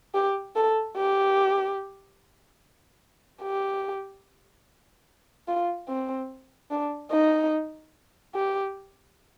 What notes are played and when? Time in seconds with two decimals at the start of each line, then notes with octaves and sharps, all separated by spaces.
0.14 G4
0.56 A4
0.97 G4
3.42 G4
5.48 F4
5.88 C4
6.71 D4
7.11 D#4
8.35 G4